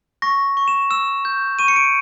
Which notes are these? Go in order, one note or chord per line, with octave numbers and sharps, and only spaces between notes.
C#6 A#6
C#6
E7
E6 E7
G6
C#6 D#7
C#7
D7